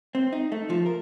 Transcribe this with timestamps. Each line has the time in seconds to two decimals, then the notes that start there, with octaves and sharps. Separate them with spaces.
0.15 C4
0.33 D#4
0.52 A3
0.70 F3
0.86 A#4